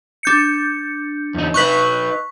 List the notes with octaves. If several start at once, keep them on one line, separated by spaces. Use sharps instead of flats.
D4 G6 C#7
E2 D#4
D#4 B4 C#6 F#6 B6